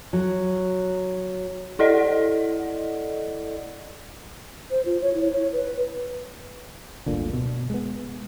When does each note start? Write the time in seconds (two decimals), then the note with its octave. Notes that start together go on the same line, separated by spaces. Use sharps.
0.13 F#3
1.79 E4 A4 D5 D#5 F#5
4.71 C5
4.85 F4
5.02 C#5
5.14 E4
5.33 C#5
5.52 B4
7.06 D1 G1 A#2 D3
7.33 B2
7.70 G#3 B3